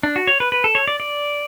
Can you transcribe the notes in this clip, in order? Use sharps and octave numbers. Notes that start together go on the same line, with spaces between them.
D4
F#4
C#5
B4
B4
A4
C#5
D5
D5